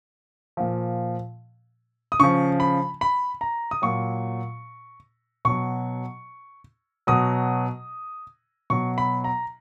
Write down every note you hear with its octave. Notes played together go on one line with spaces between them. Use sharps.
A#2 F3
D#6
C#3 F3 C#6
B5
B5
A#5
D#6
A#2 F#3 C#6
B2 F#3 C#6
B2 F#3 D#6
B2 F#3 C#6
B5
A#5